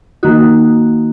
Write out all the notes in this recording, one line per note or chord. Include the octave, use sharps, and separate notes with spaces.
D#3 A#3 D#4 F#4